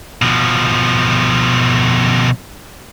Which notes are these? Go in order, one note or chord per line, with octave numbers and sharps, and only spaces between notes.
B2 F3